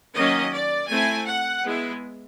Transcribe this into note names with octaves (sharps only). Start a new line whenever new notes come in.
D#3 F#3 A#3 C#4 D#5
D5
A3 C4 E4 G#5
F#5
G#3 B3 E4